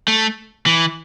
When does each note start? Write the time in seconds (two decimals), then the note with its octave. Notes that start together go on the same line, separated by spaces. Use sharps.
0.08 A3
0.66 E3